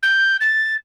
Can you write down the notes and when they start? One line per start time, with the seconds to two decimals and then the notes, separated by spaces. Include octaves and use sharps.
0.02 G6
0.40 A6